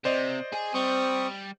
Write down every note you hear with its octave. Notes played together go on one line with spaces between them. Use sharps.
C3 C5 D5 D#5
G#4 G#5
G3 C4 C#6 D#6